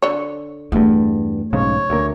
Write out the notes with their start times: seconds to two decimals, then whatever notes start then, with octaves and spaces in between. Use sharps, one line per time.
0.02 D3 C#5
0.72 E2 G2 A3
1.53 B1 G#2 C#3 C#5
1.90 D2 A#3